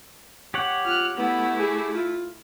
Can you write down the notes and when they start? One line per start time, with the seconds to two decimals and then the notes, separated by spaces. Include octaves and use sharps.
0.54 G4 C#5 F#5
0.85 F4 F6 F#6
1.18 A3 B3 E4
1.59 G#4
1.94 F4